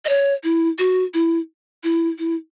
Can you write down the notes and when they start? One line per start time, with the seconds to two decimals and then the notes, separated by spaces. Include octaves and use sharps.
0.05 D#5
0.09 C#5
0.44 E4
0.79 F#4
1.14 E4
1.84 E4
2.19 E4